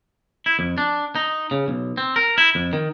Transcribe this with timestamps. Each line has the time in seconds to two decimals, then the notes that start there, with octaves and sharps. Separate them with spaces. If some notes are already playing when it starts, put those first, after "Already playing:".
0.46 E4
0.59 F2
0.78 D4
1.15 D#4
1.51 C#3
1.68 B1
1.97 C4
2.16 A#4
2.38 E4
2.55 F2
2.73 D#3